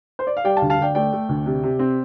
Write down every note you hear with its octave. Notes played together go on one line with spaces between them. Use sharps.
C5
D5
F5
G3 D5 G5
F5 A5
D2
F5 A5
D2 D5 G5
A3 D5 G5
A3
D2
C3
C3
C4